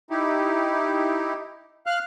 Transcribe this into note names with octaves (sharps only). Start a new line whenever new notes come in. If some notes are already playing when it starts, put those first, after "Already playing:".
D#4 E4 G4
F5 F6 F#6